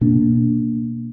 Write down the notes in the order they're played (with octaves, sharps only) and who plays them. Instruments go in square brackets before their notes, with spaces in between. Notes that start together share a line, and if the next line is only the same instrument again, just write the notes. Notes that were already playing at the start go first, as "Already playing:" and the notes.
[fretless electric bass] B2 A#3 D4